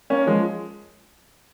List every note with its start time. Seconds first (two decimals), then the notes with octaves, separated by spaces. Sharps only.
0.10 A#3 C#4
0.27 F3 G#3